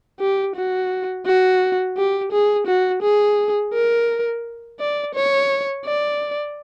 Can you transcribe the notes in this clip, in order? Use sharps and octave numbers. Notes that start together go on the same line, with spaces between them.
G4
F#4
F#4
G4
G#4
F#4
G#4
A#4
D5
C#5
D5